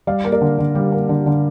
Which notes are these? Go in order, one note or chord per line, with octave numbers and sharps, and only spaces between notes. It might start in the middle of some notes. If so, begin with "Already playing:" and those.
G3 D5 F5
A#3
A#4 D5
D3
D3
G3
A#3
D3
D3